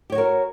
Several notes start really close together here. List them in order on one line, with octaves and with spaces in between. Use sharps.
G4 C#5 F#4 A#4